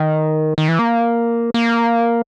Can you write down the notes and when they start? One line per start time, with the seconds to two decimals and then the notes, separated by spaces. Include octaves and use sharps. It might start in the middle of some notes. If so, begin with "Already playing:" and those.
Already playing: D#3
0.58 D#3
0.68 E3
0.79 A#3
1.54 A#3